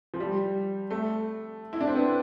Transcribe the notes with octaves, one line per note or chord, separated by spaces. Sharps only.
F3
G3
A3
E4
D4
C4
B3